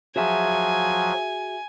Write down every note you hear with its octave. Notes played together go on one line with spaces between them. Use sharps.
F3 F#3 F#4 G#4 E5 G#5